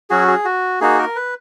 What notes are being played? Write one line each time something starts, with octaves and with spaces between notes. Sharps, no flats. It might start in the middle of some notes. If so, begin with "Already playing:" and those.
F#3 C#4 F#4 G#4
G#4
F#4
A#3 D#4 F#4 G#4
A#4
B4